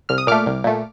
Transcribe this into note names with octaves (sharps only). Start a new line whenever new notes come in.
C2 F6
D#6
A#2 A3 D6 F6
C2
A#2 A3